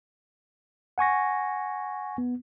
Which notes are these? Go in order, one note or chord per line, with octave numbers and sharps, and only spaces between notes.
F#5 G#5 C#6 A#6
B3